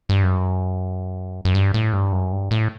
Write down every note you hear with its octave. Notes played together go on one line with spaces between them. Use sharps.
G2
F#2
F#2
G2
A2
G2
F#2
G2
A2